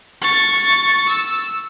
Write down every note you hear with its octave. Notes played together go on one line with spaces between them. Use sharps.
C#6 A6
E6